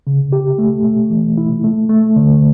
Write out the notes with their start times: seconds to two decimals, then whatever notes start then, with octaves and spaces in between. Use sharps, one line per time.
0.07 C#3
0.32 G4
0.58 A3
0.85 A3
1.10 E3
1.37 E4
1.64 A3
1.89 A3
2.16 D3